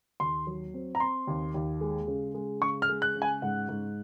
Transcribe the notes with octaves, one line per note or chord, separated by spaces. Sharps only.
D#2 C6
F#3
C4
A#5
C4 C6
D#2
D#2
G#3
C#3
G#3
C#3 C#6
F6
G#3
F#6
C#3
G#5
G#2 F#5
G#2